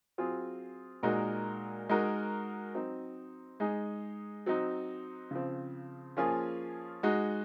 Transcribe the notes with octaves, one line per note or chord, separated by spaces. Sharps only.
F#3 C4 F4 G#4
A#2 G#3 D#4 F#4 A#4
G#3 D#4 F#4 A#4
F#3 C4 D#4
G#3 D#4 G#4
F#3 C4 D#4
C#3 F3 C4
F3 A#3 C#4 F4 G#4
G#3 D#4 F#4